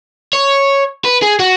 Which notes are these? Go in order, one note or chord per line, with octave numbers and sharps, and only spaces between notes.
C#5
B4
G#4
F#4